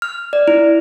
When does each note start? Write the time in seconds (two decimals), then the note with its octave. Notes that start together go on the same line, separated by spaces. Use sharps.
0.02 F6
0.33 D5
0.48 E4